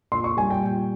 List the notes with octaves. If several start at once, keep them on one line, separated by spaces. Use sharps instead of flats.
A#2 C6
C#6
G3 G#5
G5
A#2